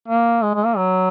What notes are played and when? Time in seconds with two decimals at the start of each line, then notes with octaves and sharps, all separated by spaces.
0.08 A#3
0.43 G#3
0.55 G#3
0.65 A#3
0.77 F#3